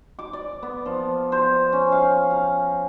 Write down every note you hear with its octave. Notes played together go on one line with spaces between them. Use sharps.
D6
D5
B3
F3
C5
C#4
F5
A#5